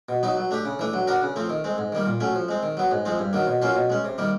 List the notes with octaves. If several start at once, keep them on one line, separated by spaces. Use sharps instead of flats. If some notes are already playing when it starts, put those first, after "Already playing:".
B2
F#3 B3 D#4
F#3
A3 D4 G4
C#3
E3 A3 D4
F#3
B3 D4 F#4 A#4
C#3
F3 A3 C4
D#3
G#3 C4
G#2
D#3 G3 A#3
A#2
F#3 A3 C#4
F3
G#3 C4
D#3
F#3 B3
G#2
F3 G#3 C4
G2
D#3 F#3 A#3
B2
F#3 A#3 C#4 F4
B2
G#3 C#4
C3
D#3 G3 A#3